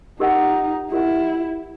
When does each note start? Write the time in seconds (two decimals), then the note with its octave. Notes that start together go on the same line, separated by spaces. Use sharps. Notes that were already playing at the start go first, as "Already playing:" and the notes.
0.19 D#4 G4 A#4 D#5 F#5
0.92 E4 G4 A#4 D#5 F#5